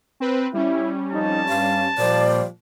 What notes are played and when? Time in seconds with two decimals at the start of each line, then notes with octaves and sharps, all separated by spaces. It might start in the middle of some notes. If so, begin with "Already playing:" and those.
0.20 C4 B4
0.54 G3 C#4 E4
1.12 F2 D#4 A5
1.49 G2 F5
1.98 A#2 F3 G3 C5 D5